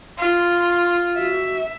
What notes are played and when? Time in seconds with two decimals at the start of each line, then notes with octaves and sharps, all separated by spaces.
0.18 F4 C6
1.17 F#4 E5